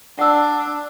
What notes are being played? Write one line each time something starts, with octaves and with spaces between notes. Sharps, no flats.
D4 F#5 E6